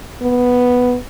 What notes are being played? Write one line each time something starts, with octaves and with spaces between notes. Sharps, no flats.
B3